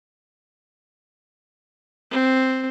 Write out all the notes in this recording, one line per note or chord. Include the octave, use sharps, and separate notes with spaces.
C4